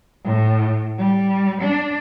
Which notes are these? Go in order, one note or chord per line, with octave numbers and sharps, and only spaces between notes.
A2
G3
D4